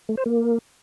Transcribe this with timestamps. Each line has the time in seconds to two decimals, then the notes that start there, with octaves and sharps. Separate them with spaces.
0.09 A3
0.17 C5
0.26 A#3